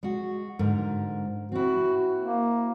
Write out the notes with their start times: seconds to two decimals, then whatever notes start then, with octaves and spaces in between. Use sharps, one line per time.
0.03 G#3 F#4
0.59 G#2 D3 A#4
1.52 C4 E4 F#4
2.20 A#3